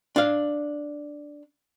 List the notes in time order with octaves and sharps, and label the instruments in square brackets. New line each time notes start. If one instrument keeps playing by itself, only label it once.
[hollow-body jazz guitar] D4 F5